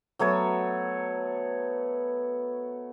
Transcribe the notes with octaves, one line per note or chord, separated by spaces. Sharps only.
F#3 A3 B3 C#5